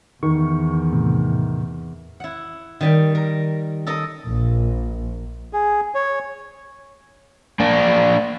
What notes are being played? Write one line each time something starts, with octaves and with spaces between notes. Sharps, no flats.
E2 D#3 C#6
A2 C3
E4 F#5
D#3 G3 G5
A#4
A4 A#4 D#5
A#1
G#4
C#5
A#3 D4